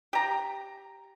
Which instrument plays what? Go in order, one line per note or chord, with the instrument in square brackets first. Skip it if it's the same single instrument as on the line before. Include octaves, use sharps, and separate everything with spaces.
[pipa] G4 A#5